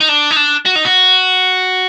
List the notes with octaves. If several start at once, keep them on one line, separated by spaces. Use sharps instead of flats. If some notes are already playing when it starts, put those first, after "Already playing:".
D#4
D4
D#4
D4
F#4
D#4
F#4